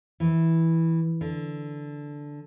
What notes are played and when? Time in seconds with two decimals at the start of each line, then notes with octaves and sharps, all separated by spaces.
0.20 E3
1.21 D3